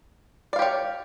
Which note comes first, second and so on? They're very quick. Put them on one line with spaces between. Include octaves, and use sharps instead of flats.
D5 F5 G4 C#5